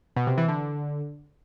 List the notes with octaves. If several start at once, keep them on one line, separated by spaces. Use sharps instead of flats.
B2
C3
E3
D3